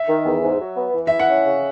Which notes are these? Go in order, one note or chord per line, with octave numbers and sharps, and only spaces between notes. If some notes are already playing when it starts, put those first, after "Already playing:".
Already playing: E5
D#3
E2
G#2
F#3
B3
E3
E5
E4
F#5
C#4
C#3